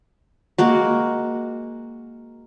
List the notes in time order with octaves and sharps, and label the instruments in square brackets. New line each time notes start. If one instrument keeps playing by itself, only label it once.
[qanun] G#3 A#3 F#4